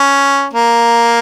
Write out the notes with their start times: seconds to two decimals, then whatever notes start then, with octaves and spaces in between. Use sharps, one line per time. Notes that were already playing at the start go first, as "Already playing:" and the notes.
Already playing: C#4
0.54 A#3